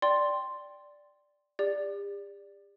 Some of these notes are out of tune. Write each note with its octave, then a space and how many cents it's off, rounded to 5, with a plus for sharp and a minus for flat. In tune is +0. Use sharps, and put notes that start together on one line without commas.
D5 +0 G5 +0 C6 +0
G4 +45 D5 +0